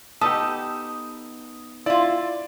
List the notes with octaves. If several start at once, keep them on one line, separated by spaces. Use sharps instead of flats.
B3 D#4 G4 A4 D#6
E4 F4 D5